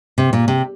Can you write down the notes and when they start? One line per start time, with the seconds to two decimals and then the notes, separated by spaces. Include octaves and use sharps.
0.18 C3
0.33 A#2
0.48 C3